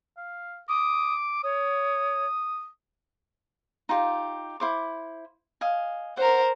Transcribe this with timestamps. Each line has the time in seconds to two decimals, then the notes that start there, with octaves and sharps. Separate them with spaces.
0.17 F5
0.69 D6 D#6
1.43 C#5 D#6
3.89 D#4 F4 G4
4.60 E4 C5 D6
5.61 D#5 F5 G#5
6.17 A#4 C5 F#5